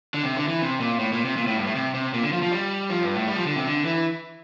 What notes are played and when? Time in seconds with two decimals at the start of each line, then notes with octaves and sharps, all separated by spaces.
0.14 D3
0.23 C3
0.36 D3
0.48 E3
0.61 C3
0.80 A#2
0.99 A2
1.12 A#2
1.25 C3
1.37 A#2
1.47 A2
1.56 G2
1.66 A2
1.75 C3
1.94 C3
2.13 A#2
2.23 D3
2.32 F3
2.42 F3
2.51 G3
2.89 F3
3.02 G2
3.15 A2
3.28 G3
3.36 F3
3.46 D3
3.56 C3
3.65 D3
3.85 E3